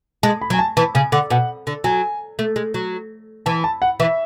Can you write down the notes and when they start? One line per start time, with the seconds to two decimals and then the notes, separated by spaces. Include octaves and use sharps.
0.23 G#3 A5
0.42 B5
0.50 F#3
0.54 G#5
0.59 A5
0.77 E3 A5
0.95 C#3 G#5
1.12 D3 F#5
1.30 B2 F#5
1.67 D3
1.84 F#3 G#5
2.39 A3
2.56 G#3
2.74 F#3
3.46 E3 A5
3.64 A5
3.82 F#5
4.00 E3 E5